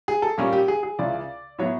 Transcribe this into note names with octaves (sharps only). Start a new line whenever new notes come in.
G#4
A4
A#2 G3 A#3 C#4
G4
G#4
G#4
C#2 C#3 E3 D5
A2 F#3 B3 C#5